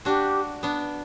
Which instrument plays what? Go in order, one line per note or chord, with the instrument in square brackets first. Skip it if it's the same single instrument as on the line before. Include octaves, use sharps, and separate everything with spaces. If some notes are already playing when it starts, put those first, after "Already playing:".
[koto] D4 F#4 [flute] G4
[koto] B3 D4